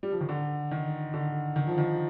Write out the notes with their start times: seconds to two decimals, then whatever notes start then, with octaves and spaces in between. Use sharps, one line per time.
0.03 G3
0.12 F3
0.21 D#3
0.29 D3
0.71 D#3
1.14 D3
1.56 D#3
1.67 F3
1.78 D#3